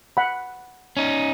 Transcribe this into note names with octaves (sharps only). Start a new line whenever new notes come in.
F#5 B5
C#4 D#4